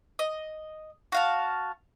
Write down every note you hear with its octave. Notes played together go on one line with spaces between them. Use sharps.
D#5
F#4 F5 A5